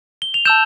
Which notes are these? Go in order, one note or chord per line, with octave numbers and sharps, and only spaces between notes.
G7
F7
A5 E6 G6 E7